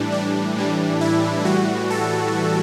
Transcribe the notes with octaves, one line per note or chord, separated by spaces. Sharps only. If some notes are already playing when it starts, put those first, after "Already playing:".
Already playing: A2 E3 G3 D4
D4
A2 E3 G3
E4
A2 E3 G3 F#4
A4